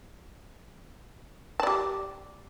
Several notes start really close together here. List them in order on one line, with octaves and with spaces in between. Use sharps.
A5 D5 G4